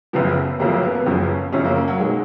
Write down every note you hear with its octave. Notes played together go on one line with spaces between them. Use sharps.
F#1 F#2 C#3 F3 B3
F#1 F#2 C#3 F3 A#3
A#3
B3
B3
F#1 F#2 C#3 F3 C#4
F#1 F#2 C#3 F3 C#4
A#3
A#3
F#3
B1 B2 G#3